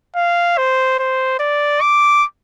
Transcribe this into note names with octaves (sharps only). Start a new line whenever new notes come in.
F5
C5
C5
D5
D6